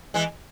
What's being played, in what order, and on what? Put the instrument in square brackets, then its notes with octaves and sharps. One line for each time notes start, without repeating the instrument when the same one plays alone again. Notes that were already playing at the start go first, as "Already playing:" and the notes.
[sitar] E3 G#3